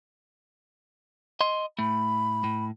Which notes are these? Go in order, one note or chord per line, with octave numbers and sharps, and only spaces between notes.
D#5 C6
A2 A3 B5
A2